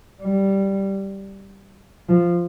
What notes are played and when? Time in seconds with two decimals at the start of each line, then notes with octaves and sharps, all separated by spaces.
0.22 G3
2.09 F3